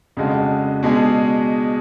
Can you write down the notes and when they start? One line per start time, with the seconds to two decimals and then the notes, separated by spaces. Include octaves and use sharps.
0.17 F2 C#3 G#3 D4 F#4
0.83 B2 G#3 D4 G#4